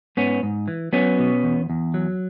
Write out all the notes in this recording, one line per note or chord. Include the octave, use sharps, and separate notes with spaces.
G#2 B3 C#4
G#2
E3
F#3 B3 C#4
B2
E2
E2
F#3